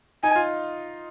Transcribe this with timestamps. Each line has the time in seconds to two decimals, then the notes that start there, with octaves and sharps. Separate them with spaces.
0.23 D#4 G#5
0.36 F4